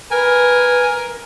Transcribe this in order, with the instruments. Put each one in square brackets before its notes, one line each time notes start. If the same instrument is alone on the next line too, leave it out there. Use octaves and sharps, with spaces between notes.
[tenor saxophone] A#4 [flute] B4 [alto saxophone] G#5